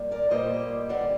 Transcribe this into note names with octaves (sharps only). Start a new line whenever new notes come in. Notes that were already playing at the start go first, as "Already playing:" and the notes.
Already playing: A#2 G3 A#3
A#4 D5
A#2 G3 A#3 C5 D#5
D3 G3 C4 D5 F#5